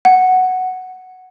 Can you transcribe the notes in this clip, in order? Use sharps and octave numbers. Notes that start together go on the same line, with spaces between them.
F#5